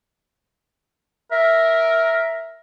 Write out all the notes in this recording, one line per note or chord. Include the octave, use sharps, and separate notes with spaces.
A#4 E5